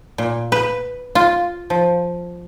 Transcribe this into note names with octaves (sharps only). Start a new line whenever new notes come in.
A#2
B4
F4
F3